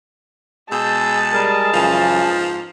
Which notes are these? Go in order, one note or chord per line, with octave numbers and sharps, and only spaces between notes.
B2 G#3 G#4 A5 E6 G6
G3 G#4 A#4
F#2 C#3 E3 F3
G#2